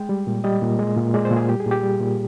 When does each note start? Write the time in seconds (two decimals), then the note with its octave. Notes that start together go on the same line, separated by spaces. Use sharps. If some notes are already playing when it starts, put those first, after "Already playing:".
Already playing: G#3 G5
0.09 G3
0.27 A#2
0.44 G3 D#5
0.62 A#2
0.79 G#3
0.96 A#2
1.14 G#3 D5
1.25 C5
1.31 A#2
1.37 G#4
1.49 G3 G4
1.60 G#4
1.66 A#2 G4
1.83 G3
2.01 A#2